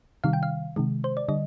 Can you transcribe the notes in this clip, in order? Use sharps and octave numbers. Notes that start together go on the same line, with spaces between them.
C3 D#3 G3 F5
G5
F5
C3 D#3 G#3
C5
D5
D3 G3 D#5